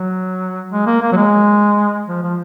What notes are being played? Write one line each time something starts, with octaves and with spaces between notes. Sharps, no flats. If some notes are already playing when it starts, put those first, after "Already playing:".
Already playing: F#3
G#3
A#3
A#3
F#3
G#3
F3
F3